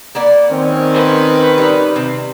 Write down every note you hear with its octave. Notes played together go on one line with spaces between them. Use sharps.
A#3 B3 D5
D#3 C4 C#4
B4
G3 D#4
C3